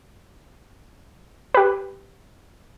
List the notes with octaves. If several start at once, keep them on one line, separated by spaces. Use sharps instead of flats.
G4 B4